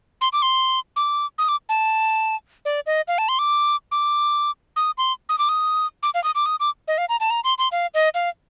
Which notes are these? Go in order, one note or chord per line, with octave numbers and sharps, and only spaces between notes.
C6
D6
C6
D6
D#6
D6
A5
D5
D#5
F5
A5
C6
D6
D6
D#6
C6
D#6
D6
D#6
D6
F5
D#6
D6
D#6
D6
D#5
F5
A#5
A5
A#5
C6
C6
F5
D#5
F5